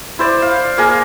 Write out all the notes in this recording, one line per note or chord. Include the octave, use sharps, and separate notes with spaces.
E4 C5 D5
F5
A#3 G#4 A#4